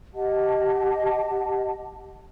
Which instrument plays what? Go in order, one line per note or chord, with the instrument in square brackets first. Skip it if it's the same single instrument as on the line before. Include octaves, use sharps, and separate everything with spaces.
[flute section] G4 D#5 F#5 A5